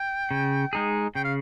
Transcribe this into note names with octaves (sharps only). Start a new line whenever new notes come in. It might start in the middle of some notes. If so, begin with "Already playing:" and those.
Already playing: G5
C#3
G#3 D#4 G#4
C#3 G5
F5